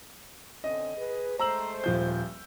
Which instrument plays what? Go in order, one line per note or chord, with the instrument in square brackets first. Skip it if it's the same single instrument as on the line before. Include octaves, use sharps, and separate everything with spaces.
[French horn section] D3 C4 C#4 [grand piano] D#5
[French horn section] G#4 B4
[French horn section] G#3 A3 C5 [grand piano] A#5 E6 F#7
[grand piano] D#1 F3 G6